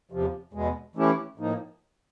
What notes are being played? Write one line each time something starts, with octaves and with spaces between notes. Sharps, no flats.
E2 C3 F3
E2 B2 G#3
E3 A3 C#4 E4 G4
A2 F3 A#3 D#4